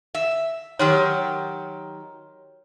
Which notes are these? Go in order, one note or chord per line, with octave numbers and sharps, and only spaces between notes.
E5
D#3 F#3 G4 C#5 C6 F6